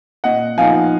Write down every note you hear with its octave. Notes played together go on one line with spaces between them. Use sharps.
A#2 D#5 F#5
F3 B3 D#4 F5 G#5